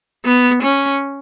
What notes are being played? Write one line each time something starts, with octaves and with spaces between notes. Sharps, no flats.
B3
C#4